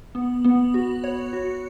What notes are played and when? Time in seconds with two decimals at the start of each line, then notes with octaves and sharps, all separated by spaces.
0.15 B3
0.44 B3
0.74 F#4
1.04 C#5
1.33 F#4